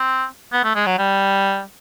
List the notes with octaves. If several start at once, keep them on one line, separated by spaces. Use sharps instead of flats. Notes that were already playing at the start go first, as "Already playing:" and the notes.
Already playing: C4
B3
A3
G#3
F#3
G3